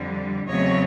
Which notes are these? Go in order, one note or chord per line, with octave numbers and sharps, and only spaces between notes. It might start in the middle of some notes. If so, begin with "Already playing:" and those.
Already playing: F2 D3 G3
E2 C#3 F#3 A3 C4 C#5 D#5